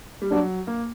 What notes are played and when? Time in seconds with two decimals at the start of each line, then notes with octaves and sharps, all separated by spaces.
0.22 G3
0.31 F#3 D4
0.67 A#3